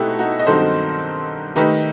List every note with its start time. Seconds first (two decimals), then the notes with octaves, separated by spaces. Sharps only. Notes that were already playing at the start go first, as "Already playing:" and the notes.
Already playing: B2 A3 C4 D#4 E4 F#4 G4 A4
0.19 D#4 F#4
0.39 D#5
0.46 G2 D#3 F#3 C4 D#4 A4 C5
1.56 D#3 A3 D#4 G4 B4